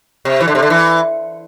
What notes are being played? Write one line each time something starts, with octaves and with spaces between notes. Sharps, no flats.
C3
E3
D3
C3
D3
E3